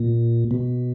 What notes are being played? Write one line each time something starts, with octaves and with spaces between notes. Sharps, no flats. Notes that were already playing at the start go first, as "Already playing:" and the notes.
Already playing: A#2
B2